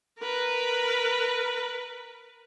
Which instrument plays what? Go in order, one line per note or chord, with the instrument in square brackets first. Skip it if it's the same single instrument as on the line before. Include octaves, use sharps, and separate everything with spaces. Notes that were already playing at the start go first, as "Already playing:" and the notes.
[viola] A#4 B4